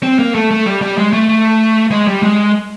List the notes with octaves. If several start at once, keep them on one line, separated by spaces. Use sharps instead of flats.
C4
A#3
A3
A3
G3
G3
G#3
A3
A3
G#3
G3
G#3